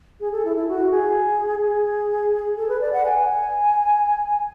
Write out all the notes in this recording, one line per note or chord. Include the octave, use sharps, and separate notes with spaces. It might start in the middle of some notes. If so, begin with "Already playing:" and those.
G#4
A4
E4
E4
F#4
G#4
G#4
A4
B4
D5
F#5
G#5